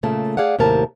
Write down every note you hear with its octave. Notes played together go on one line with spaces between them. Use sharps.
A#2 C#3 A3 A5
G#4 D5 F5 F#5
D#2 A2 C3 F#3 A#4 A5